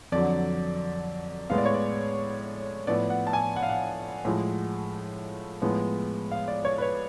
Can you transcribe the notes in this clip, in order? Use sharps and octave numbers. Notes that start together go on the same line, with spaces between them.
F2 D3 F#3 D5
A2 G#3 B3 F5
D5
C#5
D5
A2 F3 B3 D5
F#5
A5
G#5
F#5
F5
F#5
A2 F3 G#3
A2 F3 G#3 B3
F5
D5
C#5
B4
C#5